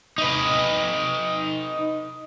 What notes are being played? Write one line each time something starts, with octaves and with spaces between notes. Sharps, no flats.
D#4 B4